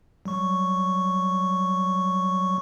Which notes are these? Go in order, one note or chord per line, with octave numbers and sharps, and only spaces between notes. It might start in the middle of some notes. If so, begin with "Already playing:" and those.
F#3 G3 C#6